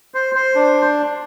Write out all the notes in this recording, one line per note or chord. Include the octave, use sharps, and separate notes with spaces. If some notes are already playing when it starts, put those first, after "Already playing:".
C5
C5
D4